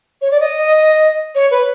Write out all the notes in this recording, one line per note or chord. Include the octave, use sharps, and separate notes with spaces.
C#5
D5
D#5
C#5
B4